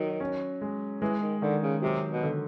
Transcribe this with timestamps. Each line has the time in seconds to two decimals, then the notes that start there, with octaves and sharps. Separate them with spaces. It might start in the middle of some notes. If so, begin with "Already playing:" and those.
Already playing: D#3 F#3
0.20 C#4
0.61 G#3
1.01 E3 G#3
1.22 D#3
1.42 D3 D#3
1.62 C#3
1.82 C3 F#3
2.10 B2
2.23 D3